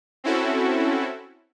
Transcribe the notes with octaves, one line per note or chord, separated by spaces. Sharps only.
C4 C#4 E4 F#4 A4